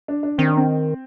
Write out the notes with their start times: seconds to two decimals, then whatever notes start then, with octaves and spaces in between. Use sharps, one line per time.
0.08 D4
0.23 D4
0.38 D#3 C4
0.47 D4
0.57 C4